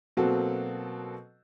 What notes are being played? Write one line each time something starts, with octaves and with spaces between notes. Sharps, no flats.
B2 F#3 A#3 C4 F#4 A4